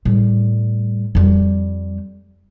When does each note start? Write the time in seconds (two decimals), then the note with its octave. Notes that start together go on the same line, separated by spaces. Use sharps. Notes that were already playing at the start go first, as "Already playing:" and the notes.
0.05 A2 G3
1.15 F2 G3